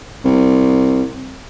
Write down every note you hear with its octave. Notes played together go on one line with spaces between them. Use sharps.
C2